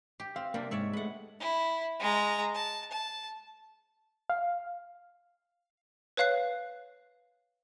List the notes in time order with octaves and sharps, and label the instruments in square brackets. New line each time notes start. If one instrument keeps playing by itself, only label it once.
[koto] G4
[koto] C4 [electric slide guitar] F5
[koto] C3 G3 D4 [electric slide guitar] A#3
[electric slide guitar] G#2 [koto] C#5 D5 E5
[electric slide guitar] G#3 A3 [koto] B4 F#5
[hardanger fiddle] E4
G#3 A#5
A5
A5
[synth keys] F5
[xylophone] B4 C#5 F5 F#6 C7